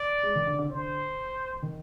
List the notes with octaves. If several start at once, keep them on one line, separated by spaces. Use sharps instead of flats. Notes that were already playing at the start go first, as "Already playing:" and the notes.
Already playing: D5
G#3
D#3
D3
D3
D3 C5
D#3